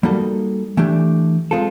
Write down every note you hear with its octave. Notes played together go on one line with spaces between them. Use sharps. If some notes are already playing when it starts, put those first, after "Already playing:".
G3 A#3 D#4 F#4 A4
E3 A3 D4 G4
G#3 C4 F4 A4